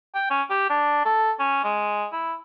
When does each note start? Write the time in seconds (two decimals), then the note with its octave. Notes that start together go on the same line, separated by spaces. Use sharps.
0.15 G5
0.31 C#4
0.50 G4
0.70 D4
1.06 A4
1.39 C#4
1.64 G#3
2.12 E4